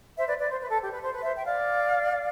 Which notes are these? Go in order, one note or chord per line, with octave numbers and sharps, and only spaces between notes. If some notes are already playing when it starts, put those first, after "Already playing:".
C5 E5
B4 D5
B4 D5
C5
B4
A4
G4
B4
C5
B4
C5 E5
E5 G5
D5 F5